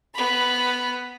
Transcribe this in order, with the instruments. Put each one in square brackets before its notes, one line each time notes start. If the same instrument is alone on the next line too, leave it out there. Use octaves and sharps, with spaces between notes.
[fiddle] B3 B5